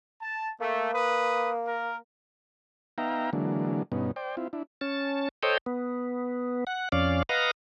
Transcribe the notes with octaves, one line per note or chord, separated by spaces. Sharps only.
A5
A3 A#3
B4 D#6
A#4
B3 D#4 E5 F5 G5 A#5
D3 E3 F#3 G#3 A#3 D4
G2 B2 B3 C#4 D#4
C5 D5 G5
C4 E4 F4
D4 E4
C#4 A5
A4 C5 C#5 D#5 G5
B3
F#5
F2 C#4 D5 F5
B4 D#5 F5 F#5 A#5